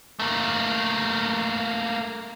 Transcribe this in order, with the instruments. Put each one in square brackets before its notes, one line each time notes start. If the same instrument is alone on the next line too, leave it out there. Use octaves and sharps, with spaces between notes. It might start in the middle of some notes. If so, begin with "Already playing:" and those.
[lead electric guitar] A3 A#3